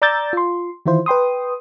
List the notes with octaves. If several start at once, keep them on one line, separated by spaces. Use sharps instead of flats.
D5 A#5 D6 E6 G6 A6
F4 C6
D#3 E3 E4 F4 C5
B4 G5 C6 D#6